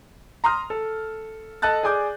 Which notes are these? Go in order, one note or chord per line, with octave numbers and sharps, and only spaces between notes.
A#5 C6 D#6 F6
A4
A4 D#5 A5 F#6 A6
G#4 D5 G#5 D6 G6